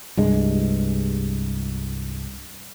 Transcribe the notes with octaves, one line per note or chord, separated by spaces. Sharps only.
C2 G2 G#3